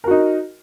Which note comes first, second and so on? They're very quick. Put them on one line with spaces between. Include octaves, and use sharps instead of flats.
A#4 F#4 D#4